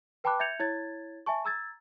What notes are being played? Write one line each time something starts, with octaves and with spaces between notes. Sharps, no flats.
B4 G5 A5 B5 D6 F#6
E5 G6 G#6 C#7 F7
E4 C#5 G#6 A6
E5 G#5 A5 C#6
A#5 E6 G#6 A6